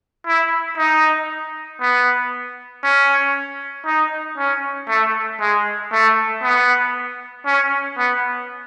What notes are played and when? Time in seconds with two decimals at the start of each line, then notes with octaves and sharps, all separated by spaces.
0.27 E4
0.78 D#4
1.81 B3
2.83 C#4
3.86 D#4
4.38 C#4
4.89 A3
5.40 G#3
5.92 A3
6.43 B3
7.46 C#4
7.98 B3